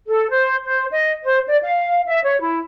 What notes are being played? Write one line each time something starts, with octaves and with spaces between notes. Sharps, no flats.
A4
C5
C5
D#5
C5
D5
F5
E5
C#5
E4